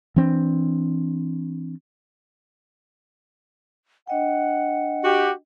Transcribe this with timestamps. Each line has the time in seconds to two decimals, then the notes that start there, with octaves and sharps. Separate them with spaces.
0.16 E3 C4 D4
4.08 D4 D#5 F#5 G5
5.04 F#4 G4